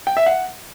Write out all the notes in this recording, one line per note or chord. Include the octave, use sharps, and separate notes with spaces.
G5
E5
F#5